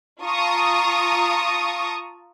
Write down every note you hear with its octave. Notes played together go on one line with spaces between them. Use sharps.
F4 A5 A#5 C#6 D#6